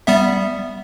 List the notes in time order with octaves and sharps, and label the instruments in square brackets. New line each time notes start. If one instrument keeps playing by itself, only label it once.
[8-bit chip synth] G3 B3 E5